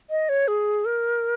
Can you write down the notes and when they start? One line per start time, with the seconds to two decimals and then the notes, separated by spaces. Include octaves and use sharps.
0.10 D#5
0.29 C#5
0.48 G#4
0.85 A#4